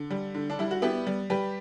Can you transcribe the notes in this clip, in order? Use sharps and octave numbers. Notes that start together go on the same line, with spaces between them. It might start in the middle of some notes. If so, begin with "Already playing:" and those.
Already playing: D3
G3
D3
D4
G3 E4
F#4
B3 E4 G4
G3
G3 G4 B4